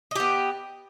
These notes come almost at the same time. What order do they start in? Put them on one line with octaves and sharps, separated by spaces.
D#5 G4 B3